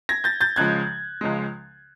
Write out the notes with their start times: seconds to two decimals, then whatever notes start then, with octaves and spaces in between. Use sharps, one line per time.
0.09 G#6 A#6
0.24 G6 A6
0.41 G6 A6
0.56 C#2 C#3 F3 G#3 F#6 G#6
1.21 C#2 C#3 F3 G#3